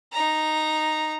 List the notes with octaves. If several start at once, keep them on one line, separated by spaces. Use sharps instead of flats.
D#4 A#5